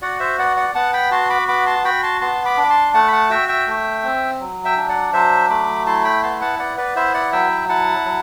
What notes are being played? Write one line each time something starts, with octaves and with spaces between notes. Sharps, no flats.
F#4 D5 F#5
C5 E5
B3 D5 F#5
D5 F#5
B3 F#5 A5
G5 B5
F#4 A5 C6
B5 D6
B3 B5 D6
A5 C6
F#4 G5 B5
A5 C6
B3 A5 C6
B5 D6
D4
D6
A5 C6
A3 F#5 A5
B5
F#5 A5
F#4 E5 G5
E5 G5
A3
C4
F#3
E5 G5
D4
D5 F#5
F#3 C5 E5
A3 B5 D6
E4 A5 C6
G5 B5
B3 A5 C6
F#5 A5
B3 D5 F#5
B4 D5
E4 C5 E5
D5 F#5
F#3 E5 G5
E4 F#5 A5
F#3